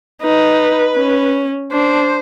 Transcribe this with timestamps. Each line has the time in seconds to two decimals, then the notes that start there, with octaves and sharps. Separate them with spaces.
0.22 D#4 B4
0.97 C#4
1.72 D4 C5